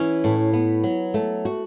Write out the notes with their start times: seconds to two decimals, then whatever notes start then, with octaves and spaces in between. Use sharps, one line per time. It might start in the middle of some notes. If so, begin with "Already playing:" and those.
Already playing: E3 C#4
0.24 A2
0.53 B3
0.84 F#3
1.14 A3
1.45 F#4